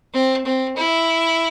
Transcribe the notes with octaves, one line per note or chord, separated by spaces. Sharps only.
C4
C4
E4